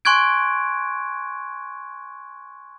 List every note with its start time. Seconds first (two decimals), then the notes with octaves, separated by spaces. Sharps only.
0.05 G#5 C6 C#6 F#6 G#6 D7